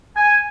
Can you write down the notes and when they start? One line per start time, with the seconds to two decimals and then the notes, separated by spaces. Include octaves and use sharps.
0.16 G#5